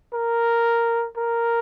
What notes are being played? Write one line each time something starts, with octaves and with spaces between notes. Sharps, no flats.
A#4
A#4